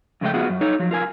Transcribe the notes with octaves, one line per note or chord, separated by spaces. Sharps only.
F2 C#3 G#3 A3 G5
B3 F4 F#4 G#4
F#2
D#4 A4 C#5
F3 F#3
F4 A#4 G#5